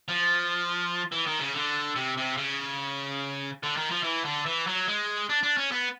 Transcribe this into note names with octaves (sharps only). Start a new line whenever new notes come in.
F3
E3
D#3
C#3
D3
C3
C3
C#3
D3
D#3
F3
E3
D3
E3
F#3
G#3
D4
D4
C#4
B3